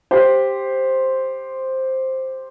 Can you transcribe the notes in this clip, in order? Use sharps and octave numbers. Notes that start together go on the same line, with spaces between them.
G4 C5